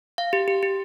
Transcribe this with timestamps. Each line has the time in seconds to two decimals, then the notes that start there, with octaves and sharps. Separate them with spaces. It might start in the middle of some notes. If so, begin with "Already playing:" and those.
0.18 F5
0.33 G4
0.48 G4
0.63 G4